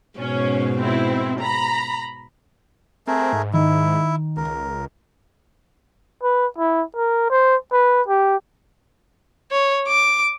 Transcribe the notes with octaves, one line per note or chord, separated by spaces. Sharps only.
G#2 B2 C#4
C4 E4
A#5 B5
A3 C4 G#4 A#4
G#2
D#3 E4
C#2 A#4
B4
E4
A#4
C5
B4
G4
C#5
D6